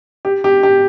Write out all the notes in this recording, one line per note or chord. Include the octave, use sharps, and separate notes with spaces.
G4
G4
G4